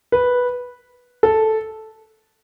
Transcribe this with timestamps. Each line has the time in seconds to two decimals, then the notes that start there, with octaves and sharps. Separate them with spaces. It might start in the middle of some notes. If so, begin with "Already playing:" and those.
0.12 B4
1.23 A4